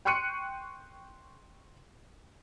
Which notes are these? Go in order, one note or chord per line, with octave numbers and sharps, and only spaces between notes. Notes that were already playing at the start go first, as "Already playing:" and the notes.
G5 C6 C#6 F#6 C#7 D#7